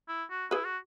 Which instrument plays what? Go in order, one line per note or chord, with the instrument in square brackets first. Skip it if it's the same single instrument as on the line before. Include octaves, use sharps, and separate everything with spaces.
[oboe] E4
F#4
[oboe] E4 [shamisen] G#4 B4
[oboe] F#4